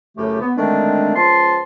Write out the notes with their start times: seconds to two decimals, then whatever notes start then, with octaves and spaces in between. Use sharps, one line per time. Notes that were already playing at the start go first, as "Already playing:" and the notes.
0.17 F#2 A2 C#3 A3 G4
0.40 B3
0.57 D3 D#3 G#3 A3 C4 D4
1.16 C#2 F3 A5 C6